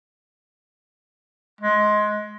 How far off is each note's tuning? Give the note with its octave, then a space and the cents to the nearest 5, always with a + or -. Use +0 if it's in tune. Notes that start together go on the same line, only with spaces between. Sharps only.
G#3 +20